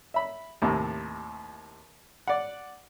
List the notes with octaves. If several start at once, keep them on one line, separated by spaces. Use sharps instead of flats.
E5 B5
D#2 A2 C3
D5 F#5